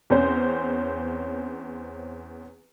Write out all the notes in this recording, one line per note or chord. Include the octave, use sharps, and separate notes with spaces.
E2 C4 C#4 C5